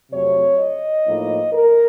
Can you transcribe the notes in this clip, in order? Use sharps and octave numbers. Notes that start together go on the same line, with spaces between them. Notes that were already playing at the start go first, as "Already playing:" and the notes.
F2 C3 F#3 A3 C#5
D#5
A2 F3 A#3 D#4
A#4